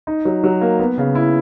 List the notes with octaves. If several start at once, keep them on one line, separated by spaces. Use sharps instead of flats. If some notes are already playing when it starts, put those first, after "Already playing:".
D#4
F#3
F#3
A#3
B3
C#3
E4